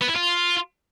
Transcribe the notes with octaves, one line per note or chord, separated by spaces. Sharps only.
B3
E4
F4